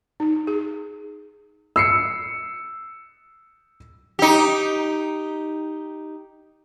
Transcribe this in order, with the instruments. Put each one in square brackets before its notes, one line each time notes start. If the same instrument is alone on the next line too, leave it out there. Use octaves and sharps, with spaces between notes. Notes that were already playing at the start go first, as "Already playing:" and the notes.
[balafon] D#4
G#4
[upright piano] E6 C7 C#7
[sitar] D#4 G4